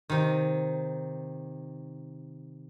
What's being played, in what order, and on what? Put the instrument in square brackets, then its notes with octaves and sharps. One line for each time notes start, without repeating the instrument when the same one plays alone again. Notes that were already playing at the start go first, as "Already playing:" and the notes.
[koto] C3 D#3